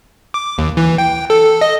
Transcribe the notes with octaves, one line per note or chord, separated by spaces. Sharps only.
D6
D#2
E3
G5
A4
D#5